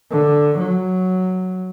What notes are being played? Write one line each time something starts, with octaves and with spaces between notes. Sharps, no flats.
D3
F#3